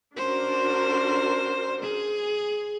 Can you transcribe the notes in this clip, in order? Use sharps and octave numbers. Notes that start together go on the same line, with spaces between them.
C#4 D4 F#4 A#4 C5
G#4